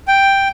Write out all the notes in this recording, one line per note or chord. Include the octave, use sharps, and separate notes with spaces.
G5